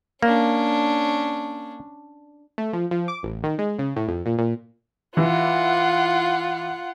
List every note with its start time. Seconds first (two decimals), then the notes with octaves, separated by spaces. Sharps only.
0.22 A#3 C#4 D4
2.58 A3
2.73 F3
2.91 F3
3.08 D6
3.23 A1
3.43 D#3
3.59 G#3
3.79 C#3
3.96 A2
4.08 F2
4.26 A#2
4.38 A#2
5.17 E3 F4 F#5